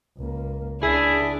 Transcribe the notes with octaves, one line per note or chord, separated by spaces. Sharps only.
C#2 A#3
C#2 D4 E4 G#4